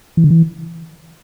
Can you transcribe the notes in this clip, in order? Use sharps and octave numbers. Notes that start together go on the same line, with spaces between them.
E3
D3
E3